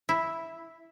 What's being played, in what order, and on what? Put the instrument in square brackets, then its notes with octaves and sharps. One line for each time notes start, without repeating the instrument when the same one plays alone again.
[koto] E4